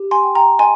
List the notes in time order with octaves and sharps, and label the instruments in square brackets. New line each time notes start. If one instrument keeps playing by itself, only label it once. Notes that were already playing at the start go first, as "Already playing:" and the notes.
Already playing: [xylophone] G4
G#5 C6
G5
G5 A#5
D#5 G#5 C6